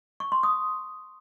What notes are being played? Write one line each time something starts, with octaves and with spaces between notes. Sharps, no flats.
C#6
C6
D#6